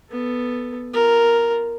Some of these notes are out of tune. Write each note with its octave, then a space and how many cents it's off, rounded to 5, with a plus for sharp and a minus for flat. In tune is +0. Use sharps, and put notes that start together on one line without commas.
B3 +0 A4 +0
F4 -15 A#4 +0